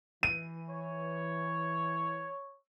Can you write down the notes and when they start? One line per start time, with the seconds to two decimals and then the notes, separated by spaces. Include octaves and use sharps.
0.23 E3 D#7
0.70 C#5